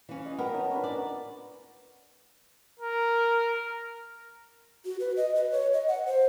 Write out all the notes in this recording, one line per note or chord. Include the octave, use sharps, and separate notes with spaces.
E3 C#4 F5
D#5
B3 F4 G4 A#4 A#5
D#4 C#5 A5
C#4 D4 B4
A#4 D5
A#4
F#4
B4
D#5
B4
C#5
D#5
F#5
C5